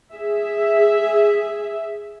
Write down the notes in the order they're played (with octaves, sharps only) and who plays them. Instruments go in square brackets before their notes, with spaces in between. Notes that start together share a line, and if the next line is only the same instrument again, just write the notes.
[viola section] G#4 E5